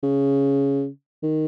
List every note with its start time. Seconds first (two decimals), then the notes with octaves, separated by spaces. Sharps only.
0.03 C#3
1.23 D#3